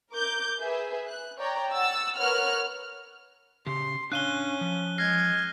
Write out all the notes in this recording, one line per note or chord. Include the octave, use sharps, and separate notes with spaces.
A#4 D6 G6
G#4 B4 E5
F#6
C#5 D5 G5 A#5
F#5 E6 A6
A#4 B4 C#5 F#5 F6 F#6
C#3 G4 C6
C#4 D4 F5 F#6 D#7 G7
F3
G#3 F6 G#6 A#6 C7